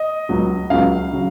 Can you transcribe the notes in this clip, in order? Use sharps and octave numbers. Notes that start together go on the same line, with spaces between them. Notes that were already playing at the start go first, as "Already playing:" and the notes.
Already playing: D#5
C#2 C#3 F#3
C#2 C#3 F#3 F5
C#3 F#3